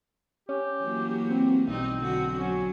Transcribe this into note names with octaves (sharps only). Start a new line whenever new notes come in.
C#4 G4
E3 F#3 A#3
C4
B1 G3 C4 D#4
D3 F#3 F#4
F#3 C#4